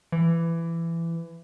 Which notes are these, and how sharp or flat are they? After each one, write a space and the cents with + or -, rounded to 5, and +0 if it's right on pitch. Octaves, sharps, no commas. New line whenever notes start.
E3 +20